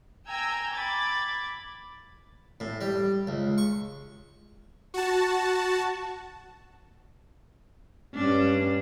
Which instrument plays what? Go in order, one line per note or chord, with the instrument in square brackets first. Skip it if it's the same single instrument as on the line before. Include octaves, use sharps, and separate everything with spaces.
[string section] G5 G#5 A#5 E6 G#6
B5 D6 G#6 A6
[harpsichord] A2
G3
C#2
C#6
[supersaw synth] F#4 A5
[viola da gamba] G2 C#4 D4